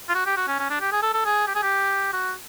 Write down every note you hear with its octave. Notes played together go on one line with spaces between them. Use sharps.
F4
F#4
G4
F#4
C#4
C#4
D4
G4
G#4
A4
A4
G#4
G4
G#4
G4
F#4